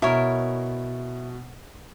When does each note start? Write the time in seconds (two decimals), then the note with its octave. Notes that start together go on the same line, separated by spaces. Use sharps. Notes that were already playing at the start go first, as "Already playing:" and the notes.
0.02 B2 E4 A#4 C#5